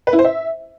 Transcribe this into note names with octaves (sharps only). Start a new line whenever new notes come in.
B4
E4
C5
E5